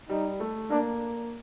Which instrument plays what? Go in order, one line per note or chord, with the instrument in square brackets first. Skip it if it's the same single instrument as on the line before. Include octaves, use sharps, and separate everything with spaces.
[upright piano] G3 [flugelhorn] D#4
[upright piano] A3
[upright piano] A#3 [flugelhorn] D4